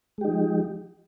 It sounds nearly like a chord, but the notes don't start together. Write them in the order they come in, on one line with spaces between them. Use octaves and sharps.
G#3 G4 D#4 F3